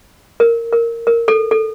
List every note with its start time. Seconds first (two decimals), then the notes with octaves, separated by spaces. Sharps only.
0.40 A#4
0.73 A#4
1.07 A#4
1.28 A4
1.51 A4